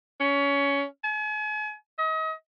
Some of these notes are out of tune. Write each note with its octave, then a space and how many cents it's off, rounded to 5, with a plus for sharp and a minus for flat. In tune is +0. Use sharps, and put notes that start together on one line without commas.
C#4 +20
G#5 +40
D#5 +35